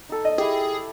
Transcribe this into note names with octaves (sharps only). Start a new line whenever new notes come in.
D#4 A4
D#5
E4 G4 G#4